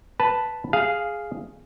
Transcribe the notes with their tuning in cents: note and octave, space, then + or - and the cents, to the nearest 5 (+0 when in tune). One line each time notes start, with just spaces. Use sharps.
B4 +0 A5 +0
G#4 +0 F5 +0